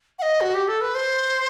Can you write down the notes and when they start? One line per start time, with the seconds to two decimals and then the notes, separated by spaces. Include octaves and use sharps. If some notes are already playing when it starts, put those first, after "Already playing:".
0.19 F#5
0.22 D#5
0.41 F#4
0.54 G4
0.68 A4
0.81 B4
0.95 C5